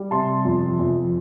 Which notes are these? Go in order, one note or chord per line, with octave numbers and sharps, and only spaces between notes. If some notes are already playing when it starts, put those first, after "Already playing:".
Already playing: G3
C3 A5 C6
F2
F2